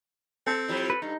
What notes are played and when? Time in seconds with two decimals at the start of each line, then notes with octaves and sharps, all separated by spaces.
0.46 C4 A4
0.68 F3 G3 E4
0.90 B4
1.02 G2 D#4